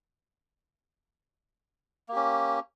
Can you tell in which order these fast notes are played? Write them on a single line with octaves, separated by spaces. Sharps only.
A#3 G4 C#4